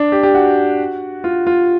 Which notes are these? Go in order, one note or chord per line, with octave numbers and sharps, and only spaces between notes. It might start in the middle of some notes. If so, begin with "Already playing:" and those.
Already playing: D4
G4
G4
F#4
F4
F4